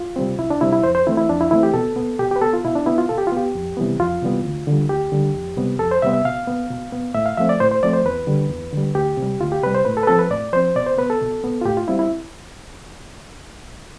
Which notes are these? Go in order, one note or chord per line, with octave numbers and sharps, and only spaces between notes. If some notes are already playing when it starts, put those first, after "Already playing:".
Already playing: F4
C3 G3 C4
C2 E4
D4
C3 G3 C4 E4
E4
F2 C5
C5
E3 A3 C4 E4
E4
F2 D4
E4
E3 A3 C4 E4
G4
B2 A4
B3
B2 G4
G4 B4
B3 A4
F4
B2 E4
D4
B3 E4
F4
B2 A4
G4
F4
B3 G4
F2
C3 E3 G3 B3
F2 F4
C3 E3 G3 B3
D2
D3 G3
D2 G4
D3 G3
F2
C3 G3 B3
F2 A4
C5
C3 G3 B3 E5
E5
B2 F5
B3
B2
B3
A2 E5
F5
F3 A3 C4 E5
D5
A2 C5
C5
F3 A3 C4 D5
C5
E2 B4
D3 G3
E2
D3 G3
D2 G4
C3
G3
D2 F4
G4
C3 G3 B4
C5
A2 B4
A4
B4
F3 C4 A4
B4
A2 D5
F3 C4 C5
B2 D5
C5
B3 B4
A4
B2
B3
F4
A2 G4
F4
G3 C4 E4
E4